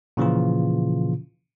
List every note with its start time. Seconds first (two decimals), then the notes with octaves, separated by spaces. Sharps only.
0.17 A#2 C#3 E3 F3 F4